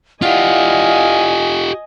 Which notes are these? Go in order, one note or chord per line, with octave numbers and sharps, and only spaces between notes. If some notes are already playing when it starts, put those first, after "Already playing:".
E4 F4 G4 D5 D#5 F5 F#5 G#5